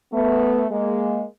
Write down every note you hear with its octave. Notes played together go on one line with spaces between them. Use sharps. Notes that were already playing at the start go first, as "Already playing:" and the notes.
A3 B3
G#3 A#3